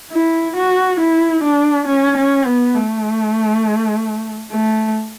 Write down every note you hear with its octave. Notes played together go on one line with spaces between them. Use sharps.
E4
F#4
E4
D4
C#4
C#4
B3
A3
A3